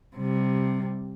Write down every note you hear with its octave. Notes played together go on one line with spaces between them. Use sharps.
C3 G3